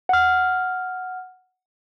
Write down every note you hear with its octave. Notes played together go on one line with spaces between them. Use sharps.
F#5 F6